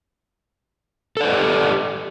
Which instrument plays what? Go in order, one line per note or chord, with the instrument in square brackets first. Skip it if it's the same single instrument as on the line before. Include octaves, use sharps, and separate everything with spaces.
[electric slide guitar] A4
D5
B4
D#5
G4